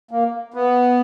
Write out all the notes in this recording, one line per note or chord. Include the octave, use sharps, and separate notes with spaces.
A#3
B3